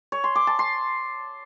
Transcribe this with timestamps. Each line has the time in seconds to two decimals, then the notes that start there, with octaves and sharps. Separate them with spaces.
0.12 C#5
0.24 C6
0.36 D6
0.47 A5
0.59 C6